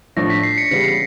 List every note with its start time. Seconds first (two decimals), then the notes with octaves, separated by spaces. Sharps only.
0.16 A2 F3 A3 D4 A#6
0.30 B6
0.43 C7
0.58 C#7
0.71 C#3 E3 G3 B3 C#7